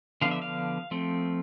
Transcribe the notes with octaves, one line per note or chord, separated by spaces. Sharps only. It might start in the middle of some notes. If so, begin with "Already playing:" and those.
D3 F3 B3 D4 F5
E5
F5
F3 A3 C4